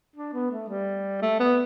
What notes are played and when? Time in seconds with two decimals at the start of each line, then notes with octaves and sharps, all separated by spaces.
0.16 D4
0.34 B3
0.52 A3
0.69 G3
1.22 A3
1.40 B3